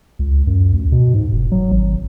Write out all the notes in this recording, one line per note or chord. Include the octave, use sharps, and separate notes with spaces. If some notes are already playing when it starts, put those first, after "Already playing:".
C#2
F#2
D2
B2
G#2
F1
F#3
G#1